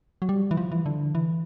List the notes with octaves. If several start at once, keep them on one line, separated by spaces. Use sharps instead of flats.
F#3
G3
E3
F3
E3
D3
E3